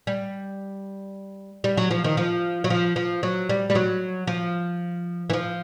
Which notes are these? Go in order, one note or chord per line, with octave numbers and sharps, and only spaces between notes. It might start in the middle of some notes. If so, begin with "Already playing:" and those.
G3
G3
F#3
F3
D#3
F3
F#3
F3
F3
F#3
G3
G3
F#3
F3
E3
F3